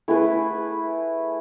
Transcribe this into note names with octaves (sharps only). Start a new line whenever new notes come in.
A3 E4 G#4 B4